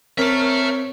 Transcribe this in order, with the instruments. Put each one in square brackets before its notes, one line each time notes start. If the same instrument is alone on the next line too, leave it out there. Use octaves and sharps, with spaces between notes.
[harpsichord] C4 [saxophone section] A#4 [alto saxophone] C#5 [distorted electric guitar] E5 A5